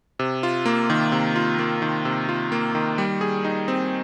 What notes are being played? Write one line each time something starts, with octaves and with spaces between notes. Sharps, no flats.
C3
F4
A#3
D#3
C3
F4
A#3
D#3
C3
F4
A#3
D#3
G3
G#4
D#4
C4